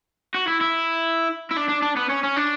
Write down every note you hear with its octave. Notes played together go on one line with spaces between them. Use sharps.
F#4
E4
E4
E4
D4
D4
D4
B3
C#4
C#4
D4